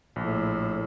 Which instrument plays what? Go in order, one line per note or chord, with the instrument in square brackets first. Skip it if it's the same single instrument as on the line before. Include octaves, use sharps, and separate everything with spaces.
[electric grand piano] A#1 [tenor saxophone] A2